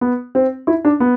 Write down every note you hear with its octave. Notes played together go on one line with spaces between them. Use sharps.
B3
C4
E4
D4
B3